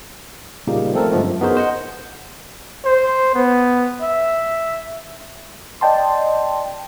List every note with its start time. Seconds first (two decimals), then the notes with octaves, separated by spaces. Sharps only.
0.67 A#2 C#3 G3 A#3 D#4 G4
0.93 F3 A3 C4 A4 A#4
1.11 G2 D3 F3 G#3 A3
1.23 F#2
1.41 B3 D#4 F#4 G#4 A#4 C5
1.57 C5 D#5 F#5
2.85 C5
3.34 B3
4.01 E5
5.81 D5 D#5 G5 A5 C6